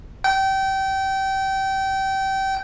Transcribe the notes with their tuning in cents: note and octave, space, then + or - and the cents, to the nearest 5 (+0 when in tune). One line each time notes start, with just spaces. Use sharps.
G5 -25